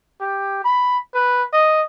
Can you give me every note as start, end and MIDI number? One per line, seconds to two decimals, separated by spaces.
0.21 0.63 67
0.64 0.98 83
1.14 1.43 71
1.53 1.82 75